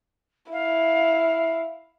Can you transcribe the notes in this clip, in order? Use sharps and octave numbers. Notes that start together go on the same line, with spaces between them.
E4 F5